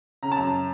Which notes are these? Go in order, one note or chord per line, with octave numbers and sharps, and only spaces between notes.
C#3 A#5
A5
F#2 A#5